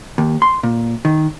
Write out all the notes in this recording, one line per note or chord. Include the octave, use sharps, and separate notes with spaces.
D#2
C6
A#2
D#3